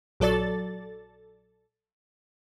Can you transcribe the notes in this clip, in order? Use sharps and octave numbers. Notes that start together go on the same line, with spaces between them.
A#1 F#3 A4 D5 A6